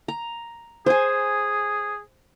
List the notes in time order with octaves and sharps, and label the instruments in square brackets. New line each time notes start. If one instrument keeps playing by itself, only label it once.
[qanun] A#5
[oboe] G#4 [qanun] C5 G#5